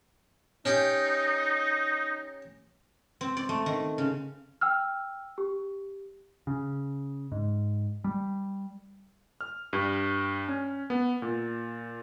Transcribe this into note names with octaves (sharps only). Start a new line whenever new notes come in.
C#4 D#4 G4
C4
D5
A3
D#3
C#3
G5 E6 F6
G4
C#3
G#2
G3
F6
G2
C#4
B3
A#2